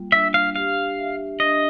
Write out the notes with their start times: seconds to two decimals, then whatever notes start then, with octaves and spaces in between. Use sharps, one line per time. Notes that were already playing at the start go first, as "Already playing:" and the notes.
Already playing: G3 A#3 F4
0.12 D4 E5
0.34 F5
0.56 G4 F5
0.98 E5
1.40 D4 D#5